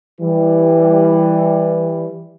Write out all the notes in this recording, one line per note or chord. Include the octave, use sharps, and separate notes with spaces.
E3 G3